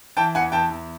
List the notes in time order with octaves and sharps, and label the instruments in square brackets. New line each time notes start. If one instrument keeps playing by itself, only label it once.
[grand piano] E3 G5 A5
E2 F#5 G#5
E2 G5 A5
E2